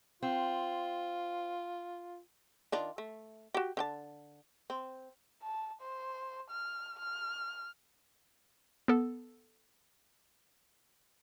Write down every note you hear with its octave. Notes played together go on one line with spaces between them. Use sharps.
C4 F4
D#3 D4 F4
A3
F#4 G4
D3 G5 A5
C4
A5
C5
F6
F6
B3 A4